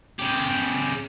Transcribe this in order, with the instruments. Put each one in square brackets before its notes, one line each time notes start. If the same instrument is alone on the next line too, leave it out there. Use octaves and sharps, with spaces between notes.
[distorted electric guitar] C#3 G4